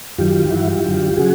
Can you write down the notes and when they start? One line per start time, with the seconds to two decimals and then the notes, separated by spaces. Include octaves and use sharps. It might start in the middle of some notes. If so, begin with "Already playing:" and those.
0.18 F#2 D#3 F#3 F4 G4
0.51 G2 E3 E4 F#4
0.67 F4 G4
0.84 F#2 D3 F#3
1.16 C#3 F#3 F#4 G#4